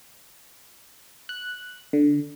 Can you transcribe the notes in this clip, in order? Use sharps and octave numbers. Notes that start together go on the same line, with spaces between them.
F#6
D3